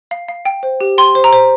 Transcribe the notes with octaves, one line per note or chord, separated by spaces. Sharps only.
F5
F5
G5
C5
G4
G5 C6
C5
A#5
C5